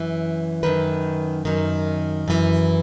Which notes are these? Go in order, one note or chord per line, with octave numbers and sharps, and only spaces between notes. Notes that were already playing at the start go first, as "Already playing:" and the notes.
Already playing: F#2 E3
F#2 D#3 B4
F#2 D#3
F#2 E3